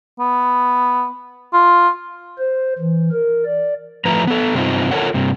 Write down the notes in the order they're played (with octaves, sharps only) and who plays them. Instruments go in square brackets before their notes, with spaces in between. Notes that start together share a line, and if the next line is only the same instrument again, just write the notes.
[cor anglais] B3
F4
[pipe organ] C5
E3
A#4
D5
[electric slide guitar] A2 F3 A3 B4 A#5
B3 A4
G2 C3 C4 D#4 F4
F4 A4 A#4 C#5 F#5
G2 C3